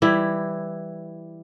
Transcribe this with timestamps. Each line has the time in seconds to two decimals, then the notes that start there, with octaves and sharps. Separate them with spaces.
0.02 E3 G3 E4